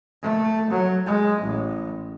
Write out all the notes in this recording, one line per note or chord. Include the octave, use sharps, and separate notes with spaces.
A3
F#3
G#3
A1